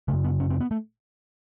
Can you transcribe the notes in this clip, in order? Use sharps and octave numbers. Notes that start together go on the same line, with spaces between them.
F#2 C#3 A3
B3
C#4
C4
B3
A3